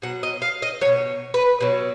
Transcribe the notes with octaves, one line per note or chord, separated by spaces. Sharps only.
B2 F#3 F#5
D#5
F5
D#5
F#3 C#5
B2
B4
B2 F#3